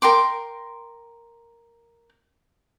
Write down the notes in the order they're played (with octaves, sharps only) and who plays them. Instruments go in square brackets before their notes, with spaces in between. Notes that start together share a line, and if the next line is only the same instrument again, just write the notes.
[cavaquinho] A#4 G5 C6 D6